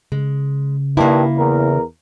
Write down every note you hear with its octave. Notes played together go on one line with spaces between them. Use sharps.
C#3 G#3
G2 D#3 A#3 E4
E2 A#4